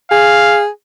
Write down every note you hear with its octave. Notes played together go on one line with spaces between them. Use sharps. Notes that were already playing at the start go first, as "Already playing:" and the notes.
G#4 F5